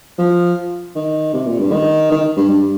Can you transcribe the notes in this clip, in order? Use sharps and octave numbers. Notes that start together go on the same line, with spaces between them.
F3
D#3
C3
A#2
G2
D#3
D#3
G2
G2